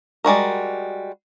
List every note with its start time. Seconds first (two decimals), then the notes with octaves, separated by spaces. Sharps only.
0.25 G3 G#3 F#4 A#4